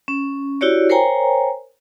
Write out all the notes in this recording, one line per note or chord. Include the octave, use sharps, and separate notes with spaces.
C#4
E4 F#4 G4 C#5 D5
A#4 C5 C#5 G5 G#5 A#5